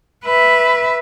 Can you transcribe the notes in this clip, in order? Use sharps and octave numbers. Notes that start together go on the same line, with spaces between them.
B4 E5